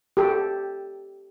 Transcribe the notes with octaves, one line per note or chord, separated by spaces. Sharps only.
G4 A4